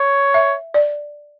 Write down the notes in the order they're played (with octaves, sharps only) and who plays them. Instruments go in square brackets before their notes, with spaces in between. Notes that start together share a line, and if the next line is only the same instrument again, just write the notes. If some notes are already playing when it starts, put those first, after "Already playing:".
Already playing: [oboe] C#5
[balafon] E5
D5